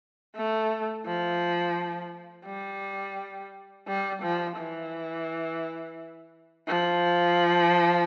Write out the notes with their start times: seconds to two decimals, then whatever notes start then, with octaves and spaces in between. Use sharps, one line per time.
0.35 A3
1.05 F3
2.46 G3
3.87 G3
4.22 F3
4.57 E3
6.68 F3